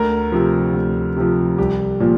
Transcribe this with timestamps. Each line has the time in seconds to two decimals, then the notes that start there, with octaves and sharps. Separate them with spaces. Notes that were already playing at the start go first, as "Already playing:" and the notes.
Already playing: D2 A#4
0.32 C3 F3
0.74 D2
1.16 C3 F3
1.58 C2 G4
2.00 A#2 F3